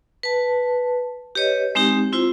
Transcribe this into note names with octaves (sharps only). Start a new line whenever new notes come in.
B4 A5
G4 B4 C#5 D#5
G#3 C4 D#4 G4
C4 E4 F4 C5